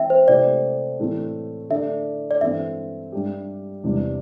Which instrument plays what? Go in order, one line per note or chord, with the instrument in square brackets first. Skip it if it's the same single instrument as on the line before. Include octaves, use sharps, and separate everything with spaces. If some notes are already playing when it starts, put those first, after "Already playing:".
Already playing: [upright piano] E3 C4 [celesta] E5 G5
[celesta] C5
[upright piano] C3 A3 E4 G4 [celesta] D5
[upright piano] A2 E3 A3 C4
[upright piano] D3 A3 D4 A4 [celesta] E5
[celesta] D5
[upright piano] G2 E3 C4 A4 [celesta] E5
[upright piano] G2 G3 D4 G4
E2 C3 G3 D4